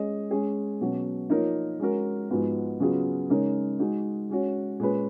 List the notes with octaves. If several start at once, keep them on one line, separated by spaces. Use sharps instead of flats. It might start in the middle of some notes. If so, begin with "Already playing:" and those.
Already playing: G#3 C#4 G#4 D#5
G#3 C#4 G#4
B2 F#3 C#4 F#4
F3 A#3 D#4 A#4 C#5
G#3 C#4 F#4 A#4
G#2 F3 G#3 B3 F#4
C#3 F#3 B3 F4 G#4
C#3 G#3 D#4 A#4 C#5
G#3 D#4 F#4
G#3 C#4 F#4 C#5
A#2 G#3 C#4 G#4 B4